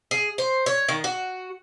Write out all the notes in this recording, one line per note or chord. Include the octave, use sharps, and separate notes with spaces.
G#4
C5
C#5
D#3
F#4